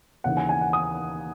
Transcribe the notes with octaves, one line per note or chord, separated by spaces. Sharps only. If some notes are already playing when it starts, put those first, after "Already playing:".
D#2 C#3 E3 F#5
G#5
G#5
F#5
D#6